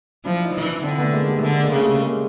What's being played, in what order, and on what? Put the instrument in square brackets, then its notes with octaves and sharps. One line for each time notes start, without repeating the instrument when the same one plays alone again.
[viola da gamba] F3 [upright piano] D4 E4
[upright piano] D#4 F4
[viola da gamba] E3
[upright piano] D4 E4
[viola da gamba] D3 [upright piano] C4 D4
[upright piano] A3 B3
G#3 A#3
G3 A3
[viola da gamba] D3 [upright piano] G#3 A#3
[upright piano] G#3 A#3
[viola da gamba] C#3
[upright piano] G3 A3
G#3 A#3